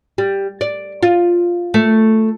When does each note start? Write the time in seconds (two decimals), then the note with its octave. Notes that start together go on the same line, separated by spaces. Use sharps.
0.18 G3
0.61 D5
1.03 F4
1.74 A3